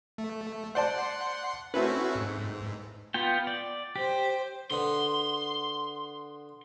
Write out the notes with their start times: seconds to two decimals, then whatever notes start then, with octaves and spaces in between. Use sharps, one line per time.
0.18 A3
0.75 C5 D5 F#5 A5 C6
1.74 A3 C4 C#4 E4 F#4 B4
2.15 G#2
3.14 B3 F4 G5
3.47 D5
3.96 G4 C5
4.71 D3 B3 C6